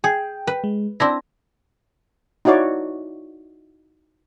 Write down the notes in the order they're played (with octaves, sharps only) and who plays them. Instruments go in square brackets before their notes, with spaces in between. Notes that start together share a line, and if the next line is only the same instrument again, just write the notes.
[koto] G#4 [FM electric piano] G5
[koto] B4
[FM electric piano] G#3
[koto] C4 D4 E4 [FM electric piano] A#6
[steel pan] D#4 E4 F#4 C#5 D5